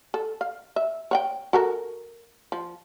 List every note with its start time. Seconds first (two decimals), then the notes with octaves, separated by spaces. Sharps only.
0.14 A4
0.41 F5
0.76 E5
1.11 C#5 F#5 G5
1.53 F#4 A4 A#4
2.52 F3